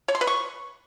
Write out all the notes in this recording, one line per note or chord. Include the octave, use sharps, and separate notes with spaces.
C#5
C6
B4
C#6